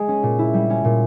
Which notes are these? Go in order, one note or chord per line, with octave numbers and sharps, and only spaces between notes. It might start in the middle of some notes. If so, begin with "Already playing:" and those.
Already playing: G#3 G#4
C#4
A#2
E4
G3
C#4
A#2